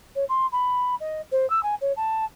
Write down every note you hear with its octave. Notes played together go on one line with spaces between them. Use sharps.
C#5
C6
B5
D#5
C5
E6
G#5
C#5
A5